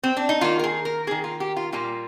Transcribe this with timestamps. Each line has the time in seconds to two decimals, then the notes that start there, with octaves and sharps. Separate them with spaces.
0.03 C4
0.17 D4
0.29 D#4
0.41 D#3 A#3 F4
0.59 A#4
0.64 G#4
0.85 A#4
1.07 D#3 A#3 G#4
1.24 F4
1.40 G4
1.57 F4
1.72 A#2 G3 A#3 F4